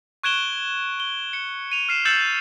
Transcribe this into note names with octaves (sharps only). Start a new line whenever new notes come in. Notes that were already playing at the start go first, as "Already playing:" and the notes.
C#6 F#6 G#6 D7 E7 G7
G7
C#7
D#7 F7
F6 C7 E7
E6 G6 A6 C#7 E7 F#7